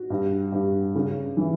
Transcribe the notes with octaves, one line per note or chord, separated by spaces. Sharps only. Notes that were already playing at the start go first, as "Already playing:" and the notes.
Already playing: F#4
G2
G2
C#3
E3